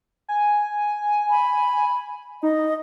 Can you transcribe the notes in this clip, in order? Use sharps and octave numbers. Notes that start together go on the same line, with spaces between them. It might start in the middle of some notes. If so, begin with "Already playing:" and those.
G#5
B5
D#4 D#5